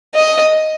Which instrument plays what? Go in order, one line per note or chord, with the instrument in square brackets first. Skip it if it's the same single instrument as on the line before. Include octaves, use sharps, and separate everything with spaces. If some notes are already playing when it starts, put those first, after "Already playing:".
[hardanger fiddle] D#5